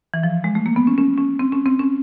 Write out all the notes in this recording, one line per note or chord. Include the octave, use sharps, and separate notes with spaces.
E3
F3
G#3
A3
A#3
B3
C#4
C#4
C#4
C4
C#4
C4
C#4